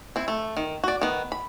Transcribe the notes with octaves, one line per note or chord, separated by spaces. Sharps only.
C4 E4
A3
D#3
F#4 D5
D#3 B3
B5